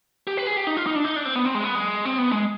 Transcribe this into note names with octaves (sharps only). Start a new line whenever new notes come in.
G4
B4
G#4
G4
D#4
F4
D#4
D4
D#4
D4
C4
B3
C4
G#3
B3
G#3
C4
B3
G#3